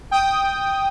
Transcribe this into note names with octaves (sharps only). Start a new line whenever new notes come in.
G5 D#6